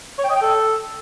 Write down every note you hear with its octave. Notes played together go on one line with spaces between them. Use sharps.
C#5
G5
D#5
G5
A4